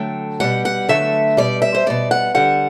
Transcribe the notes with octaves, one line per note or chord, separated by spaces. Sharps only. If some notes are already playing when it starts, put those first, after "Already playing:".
Already playing: D3 F#3 A3 G5
B2 G3 F#5
F#5
D3 F#3 A3 E5
B2 G3 D5
E5
C5
B2 G3 D5
F#5
D3 G3 F#5